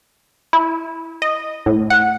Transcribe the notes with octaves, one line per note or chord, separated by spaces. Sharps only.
E4
D#5
A2
F#5